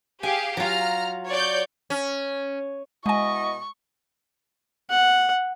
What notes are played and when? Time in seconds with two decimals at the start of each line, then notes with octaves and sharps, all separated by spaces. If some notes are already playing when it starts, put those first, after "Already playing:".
0.23 G4 G#4 F5 G#5
0.57 F#3 F4 A#5 F6
1.29 C#5 D5 G6
1.90 C#4
3.06 B2 G#3 E4 D#5 G#5 C#6
4.90 F#5